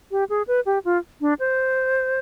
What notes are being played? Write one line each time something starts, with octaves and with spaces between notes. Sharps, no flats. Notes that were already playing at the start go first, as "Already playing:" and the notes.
G4
G#4
B4
G4
F4
D4
C5